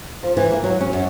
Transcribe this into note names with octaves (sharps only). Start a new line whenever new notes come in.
F3
E3
A#3
F#3
C#4
F#2